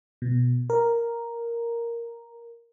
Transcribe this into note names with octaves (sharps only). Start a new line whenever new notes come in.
B2
A#4